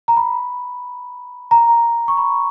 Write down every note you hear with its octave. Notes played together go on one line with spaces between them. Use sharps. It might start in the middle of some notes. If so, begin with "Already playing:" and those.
A#5
B5
A#5
C#6
B5